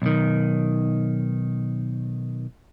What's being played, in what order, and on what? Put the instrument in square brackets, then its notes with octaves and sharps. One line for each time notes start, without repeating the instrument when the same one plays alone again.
[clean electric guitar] B1 D#3